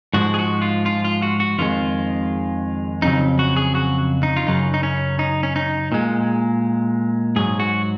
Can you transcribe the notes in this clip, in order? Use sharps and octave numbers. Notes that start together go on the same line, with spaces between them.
G#2 F3 G#3 F#4
G#4
F#4
F4
F4
F4
F#4
F#4
F2 D#3 G#3 F4
F2 C#3 F#3 D#4
F#4
G#4
F#4
D#4
F4
F#2 C#3 F#3 D#4
D#4
C#4
D#4
C#4
D#4
A#2 G#3
G#2 F#3 G#4
F#4